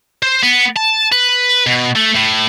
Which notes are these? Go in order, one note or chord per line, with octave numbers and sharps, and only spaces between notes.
C5
B3
A5
B4
B2
A3
A2